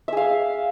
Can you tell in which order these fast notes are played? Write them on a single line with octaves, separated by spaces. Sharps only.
E5 G#4 F5